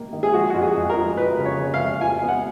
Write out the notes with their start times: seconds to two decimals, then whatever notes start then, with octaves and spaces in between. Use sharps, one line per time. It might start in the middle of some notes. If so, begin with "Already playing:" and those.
Already playing: D#3 A#3
0.13 D#3
0.23 G#4
0.33 F3 F#4
0.50 F2 F#4
0.62 G#4
0.75 F2
0.90 A#4
0.96 F3
1.17 F2 B4
1.39 C#3
1.45 C#5
1.59 C#3
1.74 F5
1.80 F2
2.01 F3 G#5
2.22 B3
2.28 F#5